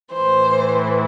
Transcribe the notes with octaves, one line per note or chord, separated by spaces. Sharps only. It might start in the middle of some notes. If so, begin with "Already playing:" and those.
A2 E3 C5